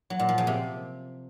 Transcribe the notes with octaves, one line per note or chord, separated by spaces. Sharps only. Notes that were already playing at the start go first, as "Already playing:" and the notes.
F#3
A#2
F3
C#3
C3